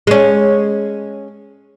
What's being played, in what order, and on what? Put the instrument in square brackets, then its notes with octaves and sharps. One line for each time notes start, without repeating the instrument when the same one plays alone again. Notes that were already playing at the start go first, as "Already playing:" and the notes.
[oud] G#3 C#4